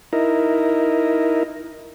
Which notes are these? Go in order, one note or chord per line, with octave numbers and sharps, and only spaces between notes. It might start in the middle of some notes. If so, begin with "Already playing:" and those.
D#4 E4 A#4